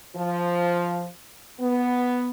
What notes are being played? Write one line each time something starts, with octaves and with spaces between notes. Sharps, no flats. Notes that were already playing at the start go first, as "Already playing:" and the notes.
F3
B3